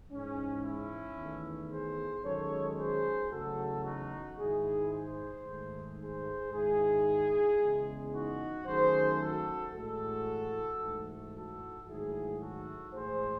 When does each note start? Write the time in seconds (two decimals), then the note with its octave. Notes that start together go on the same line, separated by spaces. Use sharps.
0.10 G#2 E3 G#3 C#4
0.64 C#4 E4
1.17 E2 D#3 A3
1.71 G#4 C5
2.24 F#2 D#3 G#3 A4 C#5
2.78 G#4 C5
3.31 E2 C#3 F#3 A3 F#4 A4
3.85 D#4 F#4
4.38 G#2 D#3 G#3 E4 G#4
4.91 G#4 C5
5.45 G#2 D#3 A3
5.99 G#4 C5
6.52 G#2 D#3 G#3 E4 G#4
7.60 E2 C#3 G#3
8.12 D#4 F#4
8.66 F#2 D#3 A3 G#4 C5
9.20 F#4 A4
9.73 A2 E3 G#3 F#4 A4
10.80 G#2 E3 A3
11.34 F#4 A4
11.87 G#2 D#3 F#3 A3 E4 G#4
12.40 F#4 A4
12.94 A2 E3 G#3 G#4 C5